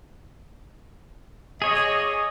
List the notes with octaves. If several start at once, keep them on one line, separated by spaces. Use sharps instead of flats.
G#4 C#5 D#5